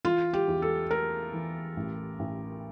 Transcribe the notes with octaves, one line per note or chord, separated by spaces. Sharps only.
E3 F4
G4
E2
A4
A3 A#4
E3
A1
A1